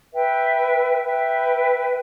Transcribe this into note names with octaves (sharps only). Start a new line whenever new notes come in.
B4 E5 G5
B4 E5 G5